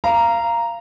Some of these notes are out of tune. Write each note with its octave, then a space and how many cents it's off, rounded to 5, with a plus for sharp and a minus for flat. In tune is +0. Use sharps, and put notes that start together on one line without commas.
F5 -25 A#5 +0